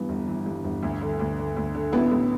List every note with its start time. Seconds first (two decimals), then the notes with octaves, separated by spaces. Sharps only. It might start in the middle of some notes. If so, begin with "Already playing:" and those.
Already playing: G2 E3 B3
0.09 G1
0.28 E3
0.46 G2
0.64 G1
0.83 D2
1.02 D3
1.20 D2
1.38 D3
1.57 D2
1.75 D3
1.92 A1 B3 E4
2.11 A1